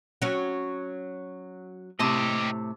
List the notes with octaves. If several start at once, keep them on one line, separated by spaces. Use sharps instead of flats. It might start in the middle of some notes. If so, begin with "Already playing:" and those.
F#3 C#4
A2 C3 G4 D#5 A5